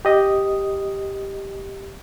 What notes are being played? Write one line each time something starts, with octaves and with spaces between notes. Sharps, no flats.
G4 D#5 D#6